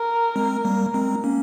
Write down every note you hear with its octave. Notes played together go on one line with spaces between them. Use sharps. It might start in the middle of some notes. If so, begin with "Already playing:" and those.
Already playing: A#4
G#3 C4
G3 A#3
G#3 C4
A#3 C#4